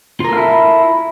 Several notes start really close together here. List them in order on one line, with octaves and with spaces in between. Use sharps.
F4 A#4 A4 F5 E4